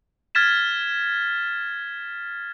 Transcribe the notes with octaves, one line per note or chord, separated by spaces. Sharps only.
F6 G#6 A6 B6 E7